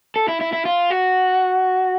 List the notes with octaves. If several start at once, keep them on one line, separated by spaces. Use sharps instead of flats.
A4
E4
E4
E4
F4
F#4